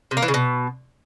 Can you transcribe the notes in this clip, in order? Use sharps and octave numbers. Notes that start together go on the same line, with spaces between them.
C3
A#3
E3
C#3
B2